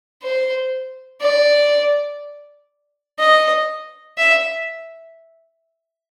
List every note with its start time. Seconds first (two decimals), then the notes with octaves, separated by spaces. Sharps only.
0.22 C5
1.21 D5
3.19 D#5
4.18 E5